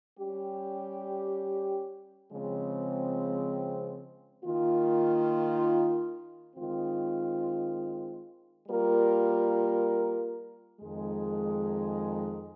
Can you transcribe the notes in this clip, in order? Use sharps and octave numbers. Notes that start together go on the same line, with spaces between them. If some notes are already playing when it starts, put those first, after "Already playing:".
G3 C#4 G4
C#3 F3 G#3 C4
D#3 A#3 F4
D#3 G#3 C4 F4
G3 A#3 F4 A#4
F2 D#3 G#3